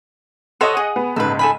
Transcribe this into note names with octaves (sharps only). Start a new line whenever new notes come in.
A4 C5 C#5 D#5 F#5
G#4
B3
A#1 G#2 C#3 A4 B4
A4 G#5 B5